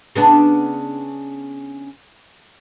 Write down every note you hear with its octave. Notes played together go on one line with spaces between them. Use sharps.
C#3 B3 D4